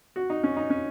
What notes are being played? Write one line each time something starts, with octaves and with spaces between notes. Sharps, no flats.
F#4
D#4
C#4
D#4
C#4